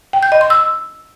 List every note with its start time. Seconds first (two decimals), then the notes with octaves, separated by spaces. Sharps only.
0.13 G5
0.23 G6
0.32 D#5
0.41 C6
0.50 E6